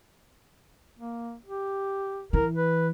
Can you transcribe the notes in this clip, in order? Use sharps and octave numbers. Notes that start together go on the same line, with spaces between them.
A#3
G4
E3 A#4
B4